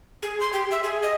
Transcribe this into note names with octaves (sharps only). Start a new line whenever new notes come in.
G#4
C6
G4
E5
G#4
D#5